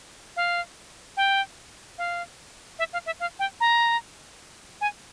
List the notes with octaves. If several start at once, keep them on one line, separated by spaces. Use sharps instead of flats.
F5
G5
F5
E5
F5
E5
F5
G5
A#5
G#5